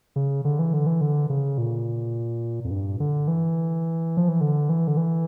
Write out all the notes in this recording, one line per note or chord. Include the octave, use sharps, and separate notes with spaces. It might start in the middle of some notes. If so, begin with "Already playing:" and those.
C#3
D3
E3
D3
E3
D3
C#3
A#2
F2
G2
D3
E3
F3
E3
D3
E3
D3
E3